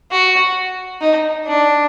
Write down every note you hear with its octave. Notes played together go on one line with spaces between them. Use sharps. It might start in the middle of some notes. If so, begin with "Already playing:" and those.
F#4
D#4
D4